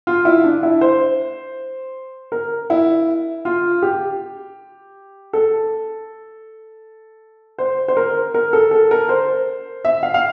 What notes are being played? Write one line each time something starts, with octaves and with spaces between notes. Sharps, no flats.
F4
E4
D4
E4
C5
A#4
E4
F4
G4
A4
C5
C5
A#4
A#4
A4
A4
A#4
C5
E5
F5
F5